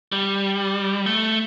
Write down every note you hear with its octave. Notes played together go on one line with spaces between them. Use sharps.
G3
A3